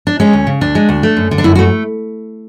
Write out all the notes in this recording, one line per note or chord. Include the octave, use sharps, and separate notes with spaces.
D4
G#3 C#4
D2
C#3
D2 D4
G#3
D2
A3
F#2
D3
D4
F#2 E4
F#4
A3